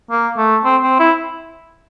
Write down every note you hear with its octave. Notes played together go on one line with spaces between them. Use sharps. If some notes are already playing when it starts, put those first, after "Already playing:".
A#3
A3
C4
C4
E4